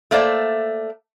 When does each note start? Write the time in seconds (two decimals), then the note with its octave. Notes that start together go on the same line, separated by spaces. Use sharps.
0.11 A3 A#3 C5 D5 E5